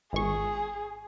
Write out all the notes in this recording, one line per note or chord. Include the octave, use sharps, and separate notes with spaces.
G#1 G#4 C#6